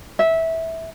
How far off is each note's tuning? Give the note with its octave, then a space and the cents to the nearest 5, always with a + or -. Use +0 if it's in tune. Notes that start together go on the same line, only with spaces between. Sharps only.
E5 -15